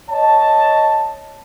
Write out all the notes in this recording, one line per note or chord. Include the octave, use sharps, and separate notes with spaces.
C#5 D#5 A5